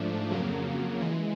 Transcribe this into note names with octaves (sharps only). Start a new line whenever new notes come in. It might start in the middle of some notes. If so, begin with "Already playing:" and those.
Already playing: G#2 F3 A3 D4
F2 C#3 F#3 A#3
E3 G#3